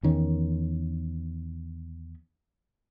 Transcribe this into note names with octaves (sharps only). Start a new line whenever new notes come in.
E2 D#3 C#4